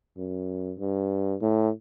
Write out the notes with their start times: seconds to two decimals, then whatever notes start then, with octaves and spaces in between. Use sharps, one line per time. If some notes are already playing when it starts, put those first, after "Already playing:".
0.17 F#2
0.79 G2
1.42 A2